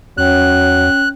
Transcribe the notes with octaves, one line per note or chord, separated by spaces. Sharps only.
E2 F#3 C#4 C#5 G5 F#6